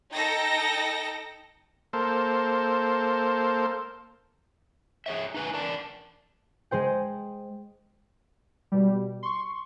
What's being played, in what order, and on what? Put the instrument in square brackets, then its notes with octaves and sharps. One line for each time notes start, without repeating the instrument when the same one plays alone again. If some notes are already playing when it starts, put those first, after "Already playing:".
[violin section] D#4 A4 G5 A#6
[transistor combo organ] A#3 A4 C5
[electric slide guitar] G#4 C#5 E5
D#4 B4 G#5
A#4 D5 A5
[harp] G#3 G#4 C5 G5
[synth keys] B2 G3
C6 C#6